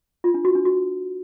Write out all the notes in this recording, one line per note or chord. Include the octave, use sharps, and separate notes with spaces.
F4
D4
F#4
D4
F#4